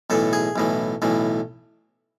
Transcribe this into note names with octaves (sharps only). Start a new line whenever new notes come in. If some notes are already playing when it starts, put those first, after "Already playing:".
B1 A2 E3 A4
G#4
B1 A2 E3
B1 A2 E3